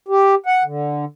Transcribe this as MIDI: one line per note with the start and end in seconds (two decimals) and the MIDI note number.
0.08 0.35 67
0.46 0.63 78
0.64 1.05 50